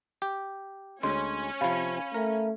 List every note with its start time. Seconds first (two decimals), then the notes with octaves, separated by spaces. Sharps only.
0.22 G4
1.03 D2 G#3 C#4 C6
1.61 C3 F3 F5 B5
2.14 A3 A#4